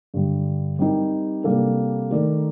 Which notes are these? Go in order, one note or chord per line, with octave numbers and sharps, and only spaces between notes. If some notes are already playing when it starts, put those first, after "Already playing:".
G2 D3 G3
G3 C4 D#4 G4 A#4
C3 G3 A#3 D4 A4
D#3 A3 D#4 A#4 D5